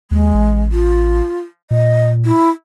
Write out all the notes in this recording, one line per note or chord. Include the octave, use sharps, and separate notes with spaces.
D#2 G#3
A1
F4
A#2 D#5
E4